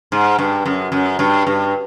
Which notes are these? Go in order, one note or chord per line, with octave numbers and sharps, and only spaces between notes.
G#2
G2
F#2
F#2
G2
G2